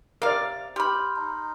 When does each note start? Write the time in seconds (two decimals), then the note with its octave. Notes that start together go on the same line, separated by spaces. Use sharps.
0.22 C3 A#4 D5 F5
0.76 G4 B5 C6 F6 G6
1.17 D#4